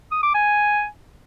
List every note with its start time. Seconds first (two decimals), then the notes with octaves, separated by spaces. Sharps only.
0.11 D#6
0.23 D6
0.34 G#5